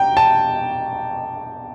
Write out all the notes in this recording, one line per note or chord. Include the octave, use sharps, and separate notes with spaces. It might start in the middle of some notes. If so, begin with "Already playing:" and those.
Already playing: G5 A#5
A5